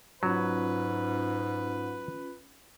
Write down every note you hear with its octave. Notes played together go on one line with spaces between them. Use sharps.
G#2 F#3 C#4 F4 B4